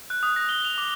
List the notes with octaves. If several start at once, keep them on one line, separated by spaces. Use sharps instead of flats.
F#6
D#6
A#6
G7
F7
D6